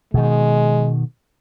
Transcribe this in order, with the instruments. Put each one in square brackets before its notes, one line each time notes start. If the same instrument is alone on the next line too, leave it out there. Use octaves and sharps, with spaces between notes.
[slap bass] B2 D#3 [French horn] G#3